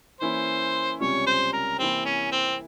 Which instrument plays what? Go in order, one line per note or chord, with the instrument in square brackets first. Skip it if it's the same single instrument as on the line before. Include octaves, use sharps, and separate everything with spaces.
[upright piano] E3 A#3 C#4 E4 [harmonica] C5
[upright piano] C#2 C3 G3 C#4 F4 [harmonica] C#5
[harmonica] C5
A#4
[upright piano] C3 E3 A#3 E4 [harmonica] C4
[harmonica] C#4
C4